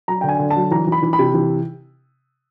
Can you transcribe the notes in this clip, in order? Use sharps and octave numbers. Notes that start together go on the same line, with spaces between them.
F#3 A#5
D3 G5
G#5
D3
A5
F#3
E3 A#5
E3
B5
E3
B5
C3
E3